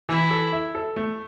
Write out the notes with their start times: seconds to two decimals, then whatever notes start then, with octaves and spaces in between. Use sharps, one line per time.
0.09 E3 E4
0.31 A4
0.52 E4
0.75 A4
0.96 A3